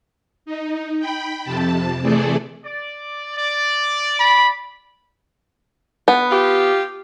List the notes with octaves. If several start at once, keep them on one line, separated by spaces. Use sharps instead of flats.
D#4
G5 B5
F2 C3 A5
C3 E3 A3 G#4 A4 D5
D5
D5
B5
B3
F4 G4